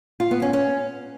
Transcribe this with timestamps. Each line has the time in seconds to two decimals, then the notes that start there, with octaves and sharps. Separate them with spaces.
0.20 F4
0.31 B3
0.42 C#4
0.53 C#4